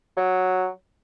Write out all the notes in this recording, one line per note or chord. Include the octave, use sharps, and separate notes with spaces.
F#3